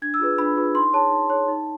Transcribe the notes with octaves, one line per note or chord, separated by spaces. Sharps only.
D4 G#6
E6
F4 G#4 B4
D4 B5
F4 G#4 B4
D#4 C6
G#4 C#5 A5
D#4
G#4 C#5
D#4